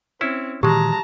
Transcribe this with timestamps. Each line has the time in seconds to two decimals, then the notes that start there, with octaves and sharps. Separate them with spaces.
0.21 C4 C#4 E4
0.63 A#2 D#3 E3 F#3 G#3 G4 A5 A#5